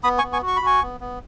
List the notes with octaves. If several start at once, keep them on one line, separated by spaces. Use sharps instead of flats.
B3 B5 D#6
G#5 C#6
B3
G#5 C#6
F#4
C#6
B5
F#4 G#5 C#6
B3
B3